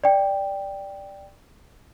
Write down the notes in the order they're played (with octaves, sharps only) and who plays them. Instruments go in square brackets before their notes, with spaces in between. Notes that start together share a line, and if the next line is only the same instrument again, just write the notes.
[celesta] D5 G5